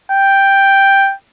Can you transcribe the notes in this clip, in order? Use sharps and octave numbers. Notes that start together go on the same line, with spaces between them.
G5